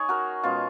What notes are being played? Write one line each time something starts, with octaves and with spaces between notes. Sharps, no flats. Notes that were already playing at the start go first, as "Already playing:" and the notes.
Already playing: D#4 G#4 C#5
F#4 A#4
B2 G#3 C#4 F4